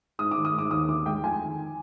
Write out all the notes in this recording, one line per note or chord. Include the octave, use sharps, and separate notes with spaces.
G#2 D#6
D#3 D6
D#6
G#2 D6
D#2 D#6
D3 D6
G#3 G5
F2 G#5
D#3